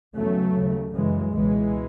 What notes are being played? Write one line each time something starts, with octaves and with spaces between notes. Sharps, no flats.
E2 C#3 F#3 A3
D#2 C#3
F#2 C#3 E3 G#3
C#2 B2 E3 G#3